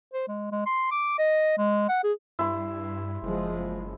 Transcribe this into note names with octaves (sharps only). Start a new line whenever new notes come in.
C5
G#3
G#3
C6
D6
D#5
G#3
F#5
G#4
G2 E4 C6
F#1 F3 G#3